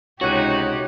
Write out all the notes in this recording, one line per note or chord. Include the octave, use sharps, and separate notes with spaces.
C#2 C3 D#4 F#4 G4 C#5 F#6 D#7